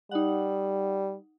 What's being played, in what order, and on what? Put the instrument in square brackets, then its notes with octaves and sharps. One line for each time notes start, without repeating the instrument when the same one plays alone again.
[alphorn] G3 [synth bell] D#4 F#5